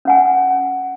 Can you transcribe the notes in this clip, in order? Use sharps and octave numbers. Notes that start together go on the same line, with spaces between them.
C#4 F#5 G#5